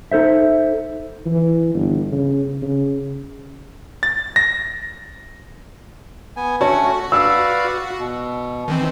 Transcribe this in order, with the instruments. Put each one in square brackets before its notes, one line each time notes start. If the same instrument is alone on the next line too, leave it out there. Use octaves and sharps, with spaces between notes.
[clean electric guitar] D#4 A4 C5 E5
[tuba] E3
G1
C#3
C#3
[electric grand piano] A6
A#6
[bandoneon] B3 G#5
[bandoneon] A3 C#4 [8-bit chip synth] F#4 [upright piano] C#5 A5
[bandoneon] B4 D5 F5 [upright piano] E6
[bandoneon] B2
[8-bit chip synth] D#3 E3 C4